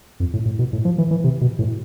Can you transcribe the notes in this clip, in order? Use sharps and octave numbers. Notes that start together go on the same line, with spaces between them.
F2
A2
A2
B2
A2
F3
E3
E3
C3
B2
A2